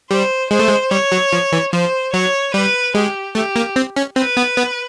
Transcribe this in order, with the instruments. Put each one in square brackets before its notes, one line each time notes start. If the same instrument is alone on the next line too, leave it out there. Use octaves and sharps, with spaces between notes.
[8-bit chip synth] G3 [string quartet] C5
[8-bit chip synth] G#3 [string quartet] C5
[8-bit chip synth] A3
G#3
[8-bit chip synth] G3 [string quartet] C#5
[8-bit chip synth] F#3
F3
E3
[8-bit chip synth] F3 [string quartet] C5
[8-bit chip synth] F#3 [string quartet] C#5
[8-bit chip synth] G3 [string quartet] B4
[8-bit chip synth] G#3 [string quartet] G4
[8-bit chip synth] A3 [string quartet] G4
[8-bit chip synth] A#3
C4
C#4
[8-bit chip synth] C4 [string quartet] B4
[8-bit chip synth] B3
B3